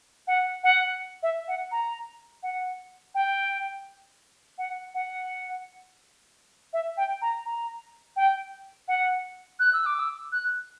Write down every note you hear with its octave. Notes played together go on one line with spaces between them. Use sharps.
F#5
F#5
E5
F#5
A#5
F#5
G5
F#5
F#5
E5
G5
A#5
A#5
G5
F#5
F#6
E6
D6
E6
F#6